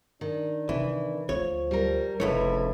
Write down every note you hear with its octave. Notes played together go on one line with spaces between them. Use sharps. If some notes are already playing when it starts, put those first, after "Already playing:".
D#3 D4
C3 E3
D2 F3 C#5
G3 A#4
F1 C#2 A2 E4 B4 C#5